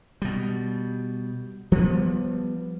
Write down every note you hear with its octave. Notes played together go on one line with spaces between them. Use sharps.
B2 G3
F3 G3 A#3 B3